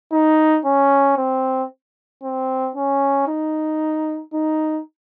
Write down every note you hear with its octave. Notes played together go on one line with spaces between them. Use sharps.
D#4
C#4
C4
C4
C#4
D#4
D#4